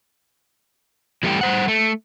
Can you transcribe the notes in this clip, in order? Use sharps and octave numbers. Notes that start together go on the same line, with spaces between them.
E3 G3 A3 D4 G4
G3 C5 F#5
A3